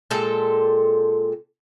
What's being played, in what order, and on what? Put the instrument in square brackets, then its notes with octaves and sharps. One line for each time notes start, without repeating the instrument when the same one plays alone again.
[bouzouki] A#2 G#3 A4 G5